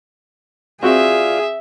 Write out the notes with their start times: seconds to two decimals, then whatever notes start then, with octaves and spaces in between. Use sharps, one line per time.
0.83 C4 F4 F#4 G#4 D5 E5 F5